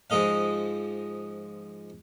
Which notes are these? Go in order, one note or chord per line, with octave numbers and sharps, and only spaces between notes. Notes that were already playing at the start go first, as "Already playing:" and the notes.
G#2 F3 G#3 G#4 D#5 F5